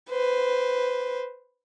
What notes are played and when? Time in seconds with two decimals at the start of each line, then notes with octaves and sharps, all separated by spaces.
0.10 B4 C5